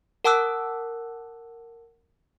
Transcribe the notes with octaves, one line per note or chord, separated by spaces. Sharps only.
A#4 F#5 A5 D6 E6 F#6